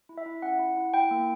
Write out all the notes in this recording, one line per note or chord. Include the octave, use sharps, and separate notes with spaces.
E4
E5
E4
C#4 F#5
E4
E4
E4 G5
A#3